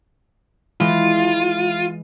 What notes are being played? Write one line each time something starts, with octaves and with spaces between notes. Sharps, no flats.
E3 G#3 E4 F4